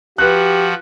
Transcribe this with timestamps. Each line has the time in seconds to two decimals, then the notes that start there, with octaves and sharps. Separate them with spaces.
0.18 F3 F#4 G4 B4 F#6